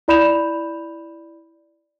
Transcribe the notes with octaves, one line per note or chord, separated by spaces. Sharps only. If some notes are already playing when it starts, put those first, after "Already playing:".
E4 D5 B5 G6 E7 F7